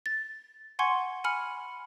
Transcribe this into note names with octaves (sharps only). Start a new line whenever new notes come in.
A6
F#5 G#5 C6 C#6 G#6 C#7
G#5 B5 F6 C#7